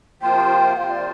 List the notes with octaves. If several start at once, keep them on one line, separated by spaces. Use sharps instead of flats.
C3 F3 A#3 F4 C5 G5
C3 F3 A#3 F4 C5 F5
D5